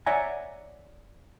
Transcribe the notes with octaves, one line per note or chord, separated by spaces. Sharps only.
C#5 D5 E5 F#5 G#5 A#5